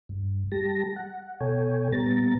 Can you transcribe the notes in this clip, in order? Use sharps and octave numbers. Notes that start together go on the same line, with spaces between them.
G2
G3 G4 A5 A#6
F#5
B2 A4 C#5 G5 G#5
A#2 G3 B3 A#5 A6